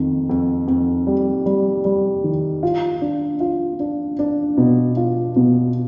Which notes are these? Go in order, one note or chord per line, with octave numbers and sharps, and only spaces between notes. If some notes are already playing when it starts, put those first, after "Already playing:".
Already playing: F2 D#3
F2
F2
G3
G3
G3
D#3
F4
D4
F4
D4
D4
B2
F4
B2